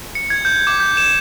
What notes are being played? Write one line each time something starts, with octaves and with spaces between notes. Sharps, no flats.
C#7
G#6
G6
D6
G6
E7